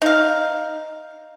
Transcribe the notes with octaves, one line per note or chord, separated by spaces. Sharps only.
D#4 F5